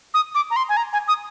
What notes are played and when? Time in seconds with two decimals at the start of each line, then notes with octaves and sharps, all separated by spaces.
0.14 D#6
0.35 D6
0.50 A#5
0.56 C6
0.69 G#5
0.77 A#5
0.93 G#5
1.08 D#6